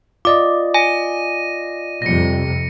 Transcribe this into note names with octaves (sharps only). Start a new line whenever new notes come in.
F4 D5 D#5 D6
G#5 A#6 D#7
F2 C3 G3 A#6 C#7